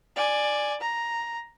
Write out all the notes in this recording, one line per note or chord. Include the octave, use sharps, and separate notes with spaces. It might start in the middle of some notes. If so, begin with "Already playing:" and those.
D5 G#5
A#5